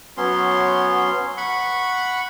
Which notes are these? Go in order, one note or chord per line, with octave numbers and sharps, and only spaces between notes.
F#3 B3 C#4 C6
F#5 B5 C#6